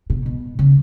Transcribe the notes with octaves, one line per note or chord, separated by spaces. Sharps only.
B2
B2
C#3